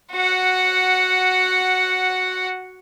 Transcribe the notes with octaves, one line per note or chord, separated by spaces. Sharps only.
F#4 F#5